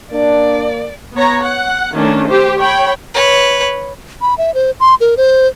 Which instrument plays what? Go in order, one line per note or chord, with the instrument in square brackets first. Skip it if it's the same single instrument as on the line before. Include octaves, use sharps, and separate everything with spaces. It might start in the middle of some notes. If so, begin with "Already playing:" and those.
[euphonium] A#3 [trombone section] D4 [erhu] D5
[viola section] B3 C#5 A#5
F#5
D#3 A3 C#4 D4
G4 C5
C#5 G5 B5
[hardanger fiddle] B4 C#5
[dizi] B5
E5
C5
C6
A#4
C5